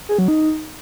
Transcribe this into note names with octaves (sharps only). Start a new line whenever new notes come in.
G#4
F#3
D#4